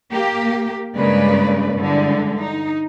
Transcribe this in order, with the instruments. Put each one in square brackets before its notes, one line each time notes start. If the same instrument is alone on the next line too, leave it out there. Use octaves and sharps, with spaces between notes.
[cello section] A#3 G4
G2 C#3 G#3 A#3 B4 D5
G2 D3 E3 G#3
D#4